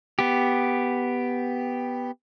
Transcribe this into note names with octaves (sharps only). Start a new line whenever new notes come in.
B3 G4